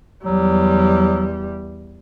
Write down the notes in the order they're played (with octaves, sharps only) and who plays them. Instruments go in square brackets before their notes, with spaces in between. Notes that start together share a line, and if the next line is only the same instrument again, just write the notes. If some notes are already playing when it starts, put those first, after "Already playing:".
[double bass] E2 G3 [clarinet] F#3